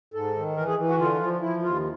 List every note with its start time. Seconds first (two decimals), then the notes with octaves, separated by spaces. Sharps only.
0.14 G#2 A4
0.36 D#3
0.56 E3 A#4
0.68 G#4
0.78 E3
0.88 F#4
0.98 D3 F4
1.21 F3
1.41 F3 E4
1.63 D#2 F4